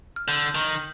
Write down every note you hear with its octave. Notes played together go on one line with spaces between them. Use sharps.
F6
D3 G6
D#3